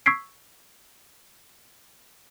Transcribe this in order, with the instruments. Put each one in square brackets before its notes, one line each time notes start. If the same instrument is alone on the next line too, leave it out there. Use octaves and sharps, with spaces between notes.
[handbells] C#6 E6 G#6 B6 C7 D7